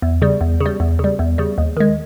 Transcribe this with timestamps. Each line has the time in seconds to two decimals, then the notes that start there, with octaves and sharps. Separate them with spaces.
0.02 E2
0.22 C#3 G3
0.41 E2
0.61 C#3
0.66 G3
0.80 E2
0.99 C#3 G3
1.19 E2
1.38 C#3 G3
1.58 D#2
1.77 D#3 G#3